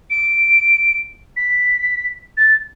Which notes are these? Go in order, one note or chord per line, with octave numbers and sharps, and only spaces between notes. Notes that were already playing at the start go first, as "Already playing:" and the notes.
D7
B6
A6